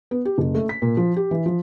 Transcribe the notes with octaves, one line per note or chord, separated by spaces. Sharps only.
B3
G4
F#1
A3
B6
A#2
F3
G4
E3
F3